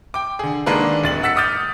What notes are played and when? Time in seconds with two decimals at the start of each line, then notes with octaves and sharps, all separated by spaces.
0.14 G5 D6
0.39 D3 G#4
0.66 D3 D#3 G#3 A#3 D4 B4
1.04 D1 A6 F#7
1.23 F#5 E6 A6 B6 C#7
1.36 D6 D#6 F6 G6 A6